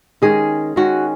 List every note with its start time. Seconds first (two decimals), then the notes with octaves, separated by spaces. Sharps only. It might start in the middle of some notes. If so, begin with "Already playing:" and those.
0.22 D#3 G#3 C#4 G#4
0.76 D#3 G#3 C#4 F#4